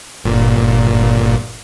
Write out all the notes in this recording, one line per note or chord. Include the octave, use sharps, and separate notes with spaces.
G1 A#2